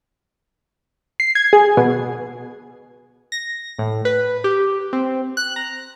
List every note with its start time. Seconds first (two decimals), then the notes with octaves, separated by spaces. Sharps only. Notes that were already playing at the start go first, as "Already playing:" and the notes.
1.20 C7
1.35 G#6
1.53 G#4
1.77 B2
3.32 A#6
3.79 A2
4.05 B4
4.44 G4
4.93 C4
5.37 F#6
5.56 A#5